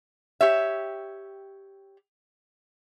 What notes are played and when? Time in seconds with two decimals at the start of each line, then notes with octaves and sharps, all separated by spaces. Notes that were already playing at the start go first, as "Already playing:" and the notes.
0.41 G4 C#5 E5